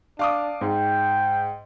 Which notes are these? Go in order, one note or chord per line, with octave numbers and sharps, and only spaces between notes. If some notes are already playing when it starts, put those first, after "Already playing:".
D4 F5 D6 D#6
G#2 G5